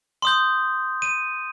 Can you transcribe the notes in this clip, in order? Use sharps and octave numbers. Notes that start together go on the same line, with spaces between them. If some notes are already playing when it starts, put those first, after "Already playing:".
C6 D#6 G6
D#7